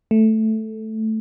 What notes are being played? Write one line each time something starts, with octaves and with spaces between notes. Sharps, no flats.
A3